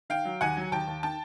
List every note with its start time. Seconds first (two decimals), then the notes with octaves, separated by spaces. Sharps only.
0.10 D#3 F5 G5
0.25 F#3
0.41 D#2 F#5 G#5
0.57 F#3
0.72 D#2 G5 A5
0.87 D#2
1.03 D#3 G5 A5